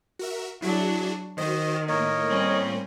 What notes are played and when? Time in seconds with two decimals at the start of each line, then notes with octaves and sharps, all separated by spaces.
0.19 F#4 A#4 E5
0.62 F#3 D4 E4 F#4 G#4
1.38 D#3 F#4 C5 D#5
1.88 A2 A#3 A#4 C#5 D#5
2.28 G3 C4 C#4